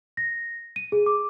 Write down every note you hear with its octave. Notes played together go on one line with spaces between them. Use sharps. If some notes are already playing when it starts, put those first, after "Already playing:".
A#6
D#7
G#4
D6